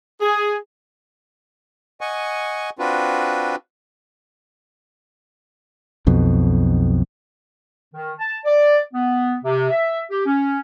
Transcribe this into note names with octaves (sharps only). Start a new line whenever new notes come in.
G#4
D#5 F#5 G#5 C#6
C4 D4 F4 F#4 B4
B1 F2 B2
D#3
A5
D5
B3
C3
E5
G4
C#4